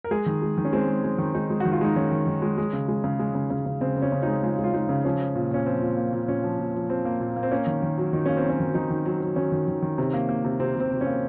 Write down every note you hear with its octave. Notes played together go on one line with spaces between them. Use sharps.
A#4
G#3 G#4
D#3
G#3
D#3
C#4
G#3 C4
G#3
G#3
D#3
G#3 D#4
G#3
D#3 F#4
F4
G#3 D#4
D#3 C#4
D#3
D#3
G#3
G#3
C#3
G#3
C#3
G#3
C#3
C#3
C#3
C#3 C4
C#3
C#4
C#3
G#3 D#4
G#3 F4
G#3
F4
G#3 D#4
C#3
F3 C#4
F3
A#2
A#2 C#4
F3 C4
A#2
A#3
A#2
A#2 C#4
F3
A#2
F3
F3 C4
A#3
A#2
A#3
C4
A#3 C#4
D#3
D#3
F#3
D#3 D#4
A#3 C#4
C4
F#3
C#4
D#3
D#3 D#4
D#3
F#3
F#3
D#3 C#4
D#3
D#3
D#3
C3
A#3
A#3
C3
C3 C4
C3 C4
C3
C#4
A#3